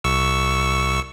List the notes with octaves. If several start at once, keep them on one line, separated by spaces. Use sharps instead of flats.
C2 C#6 E6